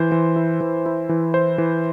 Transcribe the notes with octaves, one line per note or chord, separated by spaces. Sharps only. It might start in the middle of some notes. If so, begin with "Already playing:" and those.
Already playing: E3 C5
E3
E4
E3
E4
E3
C5
E3